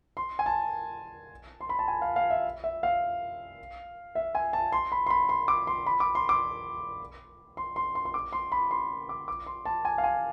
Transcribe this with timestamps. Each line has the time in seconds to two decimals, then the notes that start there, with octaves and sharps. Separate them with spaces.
0.17 C6
0.39 G#5
0.46 A5
1.61 C6
1.69 B5
1.79 A5
1.88 G#5
2.02 F5
2.16 F5
2.30 E5
2.64 E5
2.83 F5
4.15 E5
4.35 G#5
4.53 A5
4.72 C6
4.92 B5
5.06 C6
5.10 B5
5.29 C6
5.48 D6
5.67 C6
5.86 B5
6.00 D6
6.15 C6
6.29 D6
7.57 C6
7.76 C6
7.95 C6
8.05 C6
8.14 D6
8.33 C6
8.52 B5
8.71 C6
9.09 D6
9.28 D6
9.47 C6
9.65 A5
9.85 G#5
9.98 F5
10.04 G#5